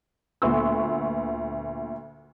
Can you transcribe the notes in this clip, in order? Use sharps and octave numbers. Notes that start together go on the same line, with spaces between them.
D2 A#2 B3 C6 C#6 E6